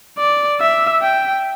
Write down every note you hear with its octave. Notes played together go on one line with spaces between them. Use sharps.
D5
E5
G5